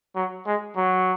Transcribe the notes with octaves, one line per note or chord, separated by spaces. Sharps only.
F#3
G#3
F#3